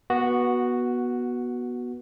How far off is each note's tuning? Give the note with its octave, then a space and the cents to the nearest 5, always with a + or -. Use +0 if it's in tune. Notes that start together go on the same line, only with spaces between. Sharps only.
B3 -20 F#4 +0